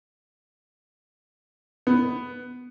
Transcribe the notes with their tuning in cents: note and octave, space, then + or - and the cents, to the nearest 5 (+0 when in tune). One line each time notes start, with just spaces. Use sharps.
B3 +10